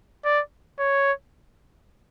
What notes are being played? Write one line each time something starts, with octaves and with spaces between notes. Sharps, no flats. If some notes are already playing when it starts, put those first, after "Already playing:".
D5
C#5